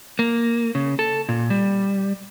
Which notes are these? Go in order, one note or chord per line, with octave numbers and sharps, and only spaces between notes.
A#3
C#3
A4
A#2
G3